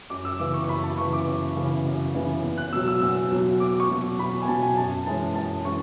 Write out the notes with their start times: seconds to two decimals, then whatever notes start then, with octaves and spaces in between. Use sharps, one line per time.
0.10 F#2 D6
0.25 E6
0.39 C#3 E3 B3 D6
0.54 C#6
0.64 C#6
0.69 F#2 B5
0.83 A5
0.98 C#3 E3 B3 C#6
1.13 D6
1.27 F#2
1.56 C#3 E3 B3
1.85 F#2
2.15 C#3 E3 B3
2.43 E2
2.58 F#6
2.73 B2 F#3 E6
2.88 E6
3.02 E2 E6
3.31 B2 F#3
3.60 E2 D6
3.80 C#6
3.89 B2 F#3
4.19 E2 B5
4.42 G#5
4.48 B2 F#3 A5
4.63 G#5
4.77 F#2 A5
5.06 E3 G#3 C#4 A5
5.36 F#2 A5
5.65 E3 G#3 C#4 C#6